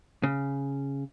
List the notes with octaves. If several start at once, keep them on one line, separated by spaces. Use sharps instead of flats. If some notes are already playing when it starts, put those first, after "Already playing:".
C#3